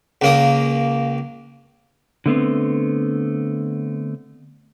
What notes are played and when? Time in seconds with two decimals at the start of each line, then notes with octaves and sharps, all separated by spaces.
0.22 C#2 A#3 D#6
2.26 D3 A3 B3 C4